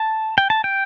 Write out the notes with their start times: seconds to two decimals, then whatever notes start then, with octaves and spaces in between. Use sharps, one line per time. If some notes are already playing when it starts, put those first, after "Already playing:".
Already playing: A5
0.38 G5
0.50 A5
0.64 G5